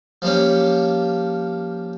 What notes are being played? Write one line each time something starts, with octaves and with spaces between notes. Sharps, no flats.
F3 G3 A#3 C#4